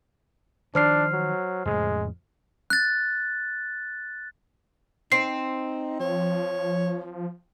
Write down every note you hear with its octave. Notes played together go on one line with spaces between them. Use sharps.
D#3 F3 D4 C5 F6 C7
F#3
F2 A2 C#3 G#3
F#6 A6
C4 D#4 C7
F3 C#5